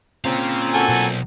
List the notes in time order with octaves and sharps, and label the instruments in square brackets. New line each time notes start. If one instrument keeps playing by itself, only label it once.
[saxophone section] A#2 C4 [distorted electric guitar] C#4 F5
[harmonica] F#4 A4 G#5
[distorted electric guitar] B1